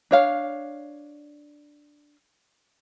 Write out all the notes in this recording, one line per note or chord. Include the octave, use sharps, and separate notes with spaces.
D4 C#5 F5